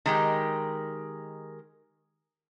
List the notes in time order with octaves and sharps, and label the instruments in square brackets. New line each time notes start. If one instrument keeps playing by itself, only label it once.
[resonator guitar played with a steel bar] D#3 G#3 G4